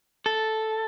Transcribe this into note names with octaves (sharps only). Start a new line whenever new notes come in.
A4